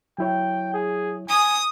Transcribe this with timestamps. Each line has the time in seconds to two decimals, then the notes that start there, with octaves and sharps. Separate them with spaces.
0.18 F#3 E4 C#5 G5
0.74 G#4
1.29 G#5 D#6